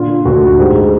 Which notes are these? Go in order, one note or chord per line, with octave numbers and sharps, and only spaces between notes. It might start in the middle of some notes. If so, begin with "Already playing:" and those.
Already playing: A#2 D3 F4
D2 F#4
G#2 G4
G#4